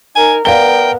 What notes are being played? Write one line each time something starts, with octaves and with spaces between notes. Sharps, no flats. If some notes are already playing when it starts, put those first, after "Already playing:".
D#4 A#4 G#5
B3 A#4 D5 F5 G5 G7